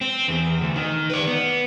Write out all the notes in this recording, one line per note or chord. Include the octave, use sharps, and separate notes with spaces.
C4
E2
D2
D#3
B4 D5
B3